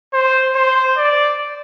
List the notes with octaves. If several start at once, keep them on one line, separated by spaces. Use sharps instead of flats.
C5
C5
D5